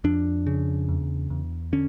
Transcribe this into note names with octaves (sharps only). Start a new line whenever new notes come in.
F2 D4
C#3
E2
E2
D3 C#4